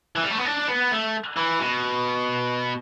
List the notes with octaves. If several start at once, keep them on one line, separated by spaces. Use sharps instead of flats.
E3
G3
A3
B3
D4
B3
A3
E3
B2